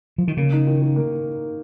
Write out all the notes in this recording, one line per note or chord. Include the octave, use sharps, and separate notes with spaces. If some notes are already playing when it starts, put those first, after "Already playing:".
F3
D#3
C#3 A#3
D#4
D#3
D#3
A#3